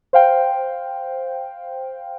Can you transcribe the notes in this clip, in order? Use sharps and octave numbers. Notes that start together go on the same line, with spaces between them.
C5 F5 G5